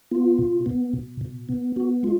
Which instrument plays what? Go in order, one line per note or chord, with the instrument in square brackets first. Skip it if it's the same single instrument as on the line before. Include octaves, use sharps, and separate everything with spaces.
[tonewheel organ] B3 F4
B2
B3
B2
B2
B3
B3 F#4
G#3 F4